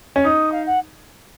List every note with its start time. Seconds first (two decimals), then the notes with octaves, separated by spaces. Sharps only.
0.16 C#4
0.24 D#4 D#6
0.52 F5
0.66 F#5